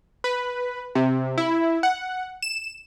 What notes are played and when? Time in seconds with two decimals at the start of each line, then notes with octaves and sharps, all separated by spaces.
0.24 B4
0.95 C3
1.38 E4
1.83 F#5
2.43 E7